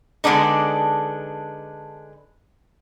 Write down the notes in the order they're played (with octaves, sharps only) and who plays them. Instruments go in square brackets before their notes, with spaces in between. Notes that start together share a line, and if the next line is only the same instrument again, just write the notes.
[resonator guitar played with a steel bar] D3 G#3 B3 D4 D#4